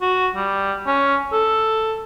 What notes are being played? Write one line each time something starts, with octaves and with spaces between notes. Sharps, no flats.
F#4
G3
C#4
A4